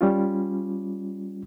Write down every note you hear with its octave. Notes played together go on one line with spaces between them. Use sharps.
G3 C#4 F4